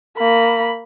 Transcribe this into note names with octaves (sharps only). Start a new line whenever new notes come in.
A#3 B5